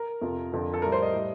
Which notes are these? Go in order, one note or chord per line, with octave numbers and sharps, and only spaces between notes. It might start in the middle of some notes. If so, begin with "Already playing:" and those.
Already playing: A#4
F2 C3 F3
F2 D3 F3
A4
A2 G3 A#4
C5
D#5
A2 G3